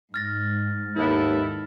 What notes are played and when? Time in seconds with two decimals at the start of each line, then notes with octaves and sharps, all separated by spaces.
0.14 G#2 F6 A6 A#6
0.96 D#2 B3 E4 A4